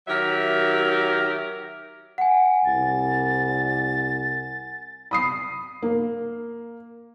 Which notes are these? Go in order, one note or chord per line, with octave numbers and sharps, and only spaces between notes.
D#3 F#3 G4 A#4 E5
F#5 G#5
C2 A6
B5 D#6 C7
A#3